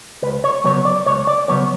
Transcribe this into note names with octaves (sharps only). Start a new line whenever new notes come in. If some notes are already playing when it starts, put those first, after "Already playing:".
C#2 B4
C#5
C#3 F#3 B3 C#5
D5
C#2 C#5
D5
C#3 F#3 B3 C#5